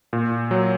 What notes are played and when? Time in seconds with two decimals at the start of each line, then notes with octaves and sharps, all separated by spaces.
0.13 A#2
0.51 F#3